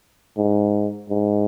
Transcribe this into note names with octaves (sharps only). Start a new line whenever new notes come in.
G#2
G#2